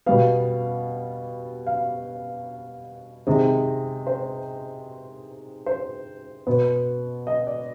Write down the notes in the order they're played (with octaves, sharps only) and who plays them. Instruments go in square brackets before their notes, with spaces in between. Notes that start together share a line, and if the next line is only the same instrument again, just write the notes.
[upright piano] B2 G3 B3 F5
F5
C3 D#3 G#3 C4 D#5
C5
C5
B2 B3
D#5
D5